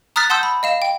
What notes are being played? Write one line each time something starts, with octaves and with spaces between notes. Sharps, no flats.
A#5 D#6 F6 F#6 A6 B6
F#5 A5 C6 D#6 E6 G6
B5
D#5 F5 E7
G5